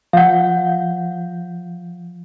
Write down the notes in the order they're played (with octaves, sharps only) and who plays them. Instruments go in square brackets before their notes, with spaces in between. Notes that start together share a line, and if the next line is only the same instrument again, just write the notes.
[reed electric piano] F3 G6 [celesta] F5 F#5